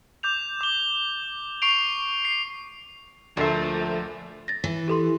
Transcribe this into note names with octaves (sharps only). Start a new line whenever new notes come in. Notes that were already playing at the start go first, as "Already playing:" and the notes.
D6 G6 F7
D6 G7
C#6 C7 D7 F7
C7
D2 A#2 F3 A3 D4 E5 C7
A6 A#6
E3
G4 A4 C6